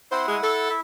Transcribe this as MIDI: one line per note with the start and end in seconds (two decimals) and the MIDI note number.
0.12 0.23 60
0.12 0.68 64
0.12 0.23 72
0.12 0.68 78
0.27 0.37 56
0.42 0.72 69
0.70 0.81 64
0.70 0.81 76